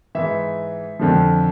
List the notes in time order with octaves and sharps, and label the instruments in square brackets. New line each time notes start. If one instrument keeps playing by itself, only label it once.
[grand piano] G#2 E3 E5
F2 D3 F3